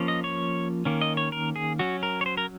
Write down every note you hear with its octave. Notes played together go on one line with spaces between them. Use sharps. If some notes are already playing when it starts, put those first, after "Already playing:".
Already playing: F3 A#3 C#4
D#5
C#5
D#3 A#3 C#4
D#5
C#5
A#4
G#4
F#3 C#4 F#4
A#4
C#5
C5
A#4